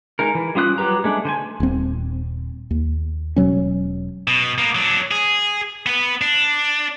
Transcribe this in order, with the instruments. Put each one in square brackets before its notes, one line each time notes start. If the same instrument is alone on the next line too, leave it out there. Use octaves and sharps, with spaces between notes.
[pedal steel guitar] G#3 D#4 A#4
E3
G3 C#4 F4 D#6 F#6
F#3 G3 G4 B4 A#5
G#3 A3 D4
D3 C5 G#5
[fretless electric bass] D#1 C4
D#2
E1 B2 F#3 C#4
[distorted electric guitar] B2
A#3 B3
F#3 D4
G#4
B3 B4
D4